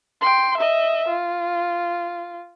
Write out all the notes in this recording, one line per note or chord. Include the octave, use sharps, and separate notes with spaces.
G5 C6
D#5 E5
F4